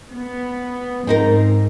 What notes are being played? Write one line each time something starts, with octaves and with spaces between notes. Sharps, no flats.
B3
G#2 C4 D#4 A#4